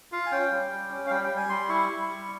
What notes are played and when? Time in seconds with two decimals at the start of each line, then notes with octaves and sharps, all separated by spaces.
0.12 F4 F5
0.26 G#5
0.31 C#4 G5
0.51 G3
0.71 G3
0.91 C#4
1.07 F5
1.10 G3 G5
1.24 G5
1.29 G3
1.37 G#5
1.49 G3 C6
1.69 E4 C#6
1.89 E4
2.09 G3